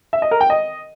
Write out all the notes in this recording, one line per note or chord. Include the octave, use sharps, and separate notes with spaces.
E5
D#5
A#4
G5
D#5